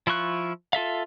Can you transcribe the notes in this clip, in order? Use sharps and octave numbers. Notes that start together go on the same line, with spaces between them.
F3 E4 F4 C#6 F#6
F4 A4 E5 F5